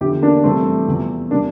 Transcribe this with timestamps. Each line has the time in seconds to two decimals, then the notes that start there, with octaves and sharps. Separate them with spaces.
0.01 E2 D3 F3 E4 G4
0.22 A#3 D4
0.44 F2 C3 E3 G3 A3 C4
0.88 E2 C3 F3
1.31 C3 G3 A#3 D4